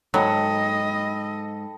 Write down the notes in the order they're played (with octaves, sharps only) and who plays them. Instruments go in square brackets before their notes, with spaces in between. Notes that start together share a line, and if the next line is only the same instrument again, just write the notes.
[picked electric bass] G#2 [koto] F#3 [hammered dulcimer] A4 G5 B5 [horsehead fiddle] D#5